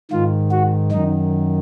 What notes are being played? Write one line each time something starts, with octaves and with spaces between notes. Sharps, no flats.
G#2 D#3 F4
F#4
F#2 D#3 D#4